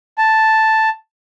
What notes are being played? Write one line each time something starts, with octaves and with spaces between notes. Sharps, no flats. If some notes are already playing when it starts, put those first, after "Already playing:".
A5